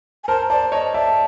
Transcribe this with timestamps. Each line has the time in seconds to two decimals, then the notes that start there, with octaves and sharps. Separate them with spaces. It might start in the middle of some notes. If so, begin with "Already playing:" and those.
0.24 G#5
0.28 A#4 C5 A5
0.50 C5 D5 A5
0.72 C#5 D#5 A5
0.94 D5 E5 A5